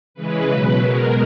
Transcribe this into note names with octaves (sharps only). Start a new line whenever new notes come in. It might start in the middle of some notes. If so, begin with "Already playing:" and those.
C#3 E3 G#3 B4
B2 F#3
B2 G#3 A#4